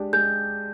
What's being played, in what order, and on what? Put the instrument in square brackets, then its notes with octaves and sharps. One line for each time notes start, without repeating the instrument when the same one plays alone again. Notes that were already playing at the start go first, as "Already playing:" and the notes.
Already playing: [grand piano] G#3 D4 G4
[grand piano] G#3 [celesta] G6